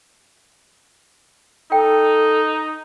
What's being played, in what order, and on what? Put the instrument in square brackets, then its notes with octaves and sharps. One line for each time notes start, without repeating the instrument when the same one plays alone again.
[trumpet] D#4 [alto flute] A4 [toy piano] G5